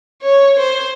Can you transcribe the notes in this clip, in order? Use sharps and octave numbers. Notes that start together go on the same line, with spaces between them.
C#5
C5